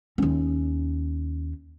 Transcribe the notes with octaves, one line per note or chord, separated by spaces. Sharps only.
D#2 C#4